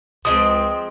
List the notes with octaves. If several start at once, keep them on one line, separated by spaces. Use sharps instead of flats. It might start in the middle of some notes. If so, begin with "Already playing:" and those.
C#2 F3 G#3 C4 D#6